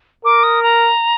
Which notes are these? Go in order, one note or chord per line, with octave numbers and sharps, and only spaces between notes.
A#4 D6
D#6
A#5